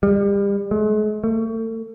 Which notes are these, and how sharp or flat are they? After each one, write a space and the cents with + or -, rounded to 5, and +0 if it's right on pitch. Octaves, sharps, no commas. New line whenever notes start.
G3 +35
G#3 +45
A3 +35